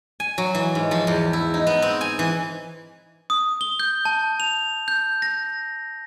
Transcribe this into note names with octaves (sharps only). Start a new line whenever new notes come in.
G#5
F#3
E3
G#2
F3
E2
E4
D#4
B3
C4
G#5
E3
D#6
G7
G6
A5
F7
G6
A#6